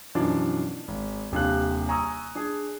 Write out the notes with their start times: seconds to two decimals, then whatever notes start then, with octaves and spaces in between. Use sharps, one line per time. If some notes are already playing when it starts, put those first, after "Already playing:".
0.15 F#2 B2 E3 F3 D4
0.88 G#1
1.32 D#1 C3 D4 F5 F#6
1.88 G#5 A#5 C#6 D#6 E6
2.35 D4 G#4